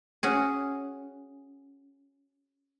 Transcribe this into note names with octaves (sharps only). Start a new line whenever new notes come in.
C#4 F#4 G#4